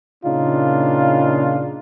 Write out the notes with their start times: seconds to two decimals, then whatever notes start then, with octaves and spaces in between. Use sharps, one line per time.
0.24 A#2 C#3 D4 D#4 F4